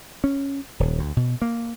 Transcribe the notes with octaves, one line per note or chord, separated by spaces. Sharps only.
C#4
D#1
D2
B2
A#3